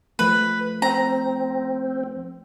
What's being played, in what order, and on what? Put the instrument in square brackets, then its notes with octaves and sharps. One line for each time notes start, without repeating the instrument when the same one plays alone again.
[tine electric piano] F3 A3 [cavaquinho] B4
[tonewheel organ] C4 [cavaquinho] A#5